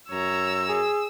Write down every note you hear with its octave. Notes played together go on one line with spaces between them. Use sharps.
F#2 C#5 A#5 E6
G#4